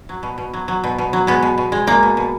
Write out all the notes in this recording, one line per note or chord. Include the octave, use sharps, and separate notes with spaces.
F#3
B2
B2
F#3
F#3
B2
B2
F#3
G#3 B3
B2
B2
G#3
G#3 A#3
B2
B2